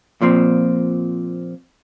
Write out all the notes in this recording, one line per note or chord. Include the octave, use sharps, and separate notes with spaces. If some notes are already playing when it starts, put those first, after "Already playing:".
A#2 F3 C4